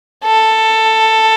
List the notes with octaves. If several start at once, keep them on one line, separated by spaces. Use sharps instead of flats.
A4